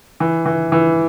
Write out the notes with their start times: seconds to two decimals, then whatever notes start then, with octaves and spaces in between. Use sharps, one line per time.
0.20 E3
0.46 E3
0.72 E3